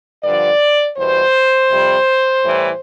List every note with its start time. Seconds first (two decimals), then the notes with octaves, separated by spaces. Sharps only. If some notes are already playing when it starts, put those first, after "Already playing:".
0.23 G2 D3 F3 D5
0.97 E2 B2 G3 C5
1.70 F2 C3 G3
2.44 A2 E3 G3